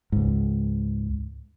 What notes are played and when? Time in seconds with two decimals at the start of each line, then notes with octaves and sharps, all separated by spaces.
0.12 C#2 G#2